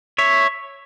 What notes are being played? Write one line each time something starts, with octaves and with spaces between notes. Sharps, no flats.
C#5 E5